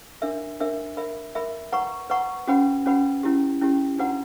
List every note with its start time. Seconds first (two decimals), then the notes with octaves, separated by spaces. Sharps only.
0.22 D4 A#4 E5
0.60 D4 A#4 E5
0.97 A#4 E5 B5
1.35 A#4 E5 B5
1.72 B4 F#5 A#5 C#6
2.10 B4 F#5 A#5 C#6
2.47 C#4 F#4 B4 F#5 B5
2.86 C#4 F#4 B4 F#5 B5
3.23 C#4 E4 G4
3.61 C#4 E4 G4
3.98 D4 F#4 B4 F#5 A#5